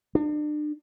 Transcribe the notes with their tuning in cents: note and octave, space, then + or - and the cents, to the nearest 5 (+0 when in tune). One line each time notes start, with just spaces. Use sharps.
D4 +35